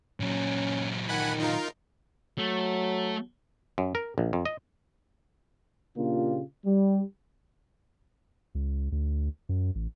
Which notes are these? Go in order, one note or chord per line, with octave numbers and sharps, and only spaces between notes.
A#2 F#3 C#4
D#3 F#5 G#5 B5
D#4 F4 A#4
F#3 A3
F#2
A#4
A#1
F2
D#5
A#2 C#3 A#3 D4 F4 G4
G3
C#2
D2
F#2
A1